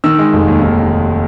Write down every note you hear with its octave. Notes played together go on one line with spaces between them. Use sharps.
D#3 E6
G#3
F1
D#2
D#3